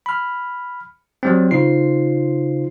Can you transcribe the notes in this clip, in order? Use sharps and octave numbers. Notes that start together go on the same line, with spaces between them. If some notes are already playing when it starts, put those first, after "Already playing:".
B5 F6
F#3 G3 C4
C#3 D#4 F4 C5 C7